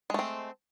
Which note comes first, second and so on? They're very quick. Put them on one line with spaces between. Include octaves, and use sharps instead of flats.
G#3 A3 C4